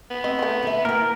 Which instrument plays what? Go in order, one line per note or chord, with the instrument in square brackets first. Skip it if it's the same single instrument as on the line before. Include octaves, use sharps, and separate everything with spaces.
[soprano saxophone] B3
[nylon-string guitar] C4 [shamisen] D#5
[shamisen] A3 A#3
[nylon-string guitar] D3 E5
[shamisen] E3 [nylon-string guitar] A#3 G5 [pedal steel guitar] A#4